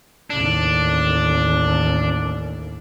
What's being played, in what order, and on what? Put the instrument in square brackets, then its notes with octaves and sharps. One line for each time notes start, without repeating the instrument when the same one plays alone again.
[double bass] A1 D#2 [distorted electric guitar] D4